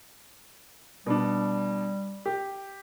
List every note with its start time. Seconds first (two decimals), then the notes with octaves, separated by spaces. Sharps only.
1.06 B2 G3 D4
2.26 G4